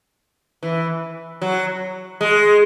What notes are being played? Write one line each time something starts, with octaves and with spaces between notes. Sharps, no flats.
E3
F#3
G#3